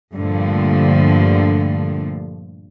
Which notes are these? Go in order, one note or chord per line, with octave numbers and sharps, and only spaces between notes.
G2 A#2 D3 F3 A3